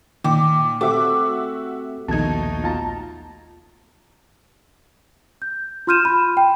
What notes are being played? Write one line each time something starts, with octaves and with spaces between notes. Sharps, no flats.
A#2 D#3 G5 D6
A3 C4 F#4 G4 A4 E5 D6
A#1 D#2 B2 A3 D#4 A5 G#6
F4 A5 A#5
G6
F4 C6 F6 G6 D#7 E7
B5
G5